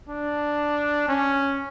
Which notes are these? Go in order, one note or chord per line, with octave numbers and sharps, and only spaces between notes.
D4
C#4